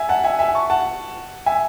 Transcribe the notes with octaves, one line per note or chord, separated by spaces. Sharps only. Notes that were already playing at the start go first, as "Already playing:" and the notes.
Already playing: E5 G#5
F#5 A5
E5 G#5
E5 G#5
A5 C#6
F#5 A5
E5 G#5